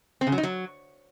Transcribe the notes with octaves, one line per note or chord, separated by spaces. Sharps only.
C4
C#3
F#3
D#4
F#3